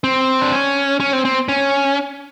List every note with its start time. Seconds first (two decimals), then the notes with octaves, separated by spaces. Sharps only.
0.04 C4
0.41 D4
0.53 C#4
1.00 C#4
1.13 C4
1.25 C4
1.49 C#4